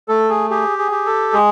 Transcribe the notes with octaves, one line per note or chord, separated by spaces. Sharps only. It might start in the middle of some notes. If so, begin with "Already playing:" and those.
A3 A4
G#4
G4 G#4
G#4
G4
A4
G#3 G#4